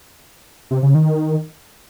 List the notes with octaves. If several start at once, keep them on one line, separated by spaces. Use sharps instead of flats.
C3
C#3
D#3
D#3